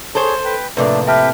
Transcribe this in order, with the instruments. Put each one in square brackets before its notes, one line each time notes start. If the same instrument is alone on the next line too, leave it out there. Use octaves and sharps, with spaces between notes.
[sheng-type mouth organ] G#4 C#5 [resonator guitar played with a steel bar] A4 C5
[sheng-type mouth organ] B4 G5
[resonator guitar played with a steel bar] F2 [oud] A2 C3 A#3 [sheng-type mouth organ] A3 D4 [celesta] B4
[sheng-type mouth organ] G4 B4 G5 [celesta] E5 A5 F6